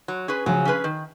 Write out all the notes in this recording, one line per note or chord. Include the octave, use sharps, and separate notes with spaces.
F#3
C#4 G#4 B4
C#3 F3 F#3
C#4 G#4 B4
D#3